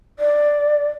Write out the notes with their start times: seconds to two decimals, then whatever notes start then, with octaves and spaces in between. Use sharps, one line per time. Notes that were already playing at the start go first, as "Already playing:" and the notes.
0.19 D5